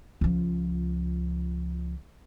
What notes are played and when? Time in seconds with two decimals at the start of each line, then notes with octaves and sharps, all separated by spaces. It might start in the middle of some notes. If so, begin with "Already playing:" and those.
0.21 C#2 F3